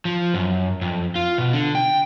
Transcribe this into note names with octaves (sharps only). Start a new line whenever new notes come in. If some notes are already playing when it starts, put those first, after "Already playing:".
F3
F#2
F2
F4
B2
D3
G5